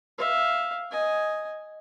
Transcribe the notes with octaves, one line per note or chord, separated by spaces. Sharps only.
E5 F5
D#5 G#5